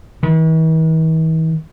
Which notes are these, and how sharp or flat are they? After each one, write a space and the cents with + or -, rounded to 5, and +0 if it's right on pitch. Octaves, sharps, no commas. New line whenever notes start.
E3 -45